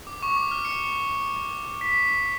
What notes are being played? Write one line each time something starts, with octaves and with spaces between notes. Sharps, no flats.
D6
C#6
D6
F6
C#7
B6